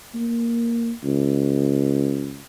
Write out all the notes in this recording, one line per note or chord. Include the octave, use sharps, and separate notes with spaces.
A#3
C#2